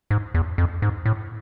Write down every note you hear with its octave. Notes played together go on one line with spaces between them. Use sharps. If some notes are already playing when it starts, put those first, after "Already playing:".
G#2
E2
F2
G#2
A2